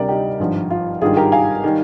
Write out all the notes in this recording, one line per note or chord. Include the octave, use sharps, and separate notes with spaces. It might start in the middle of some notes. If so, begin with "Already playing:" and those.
Already playing: D2 C3 G3 A#4 D5
D#4 G4
G#1 G2 F3
F4
G#1 G2 D#3 G3 F4 G#4
G4 A#4
F5 G#5
D#3 G3